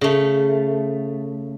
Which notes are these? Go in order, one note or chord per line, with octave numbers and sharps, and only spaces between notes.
C#3 A3